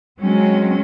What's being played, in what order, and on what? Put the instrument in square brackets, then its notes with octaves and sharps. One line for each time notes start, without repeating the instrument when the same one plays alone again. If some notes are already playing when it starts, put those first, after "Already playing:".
[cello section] F#3 G#3 C4 C#4